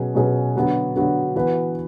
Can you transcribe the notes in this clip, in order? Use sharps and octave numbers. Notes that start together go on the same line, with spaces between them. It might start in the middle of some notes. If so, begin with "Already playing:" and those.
Already playing: B2 F#3 C#4 G#4 B4
B2 F#3 C#4 G#4 B4
D3 F#3 B3 F#4
D3 F#3 B3 F#4
E3 B3 F#4 B4